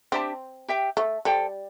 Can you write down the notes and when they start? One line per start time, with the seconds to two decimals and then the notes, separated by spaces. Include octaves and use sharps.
0.12 C4 D4 G4 E5 A5
0.68 G4 E5 G5
0.97 A3
1.25 G3 A4 C5 G5